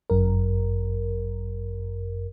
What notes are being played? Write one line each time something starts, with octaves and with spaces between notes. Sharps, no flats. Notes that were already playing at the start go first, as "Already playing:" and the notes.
G1 F#2 A#4